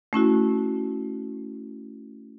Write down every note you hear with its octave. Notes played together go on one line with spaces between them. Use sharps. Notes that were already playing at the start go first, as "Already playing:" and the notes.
A3 C#4 E4 F#4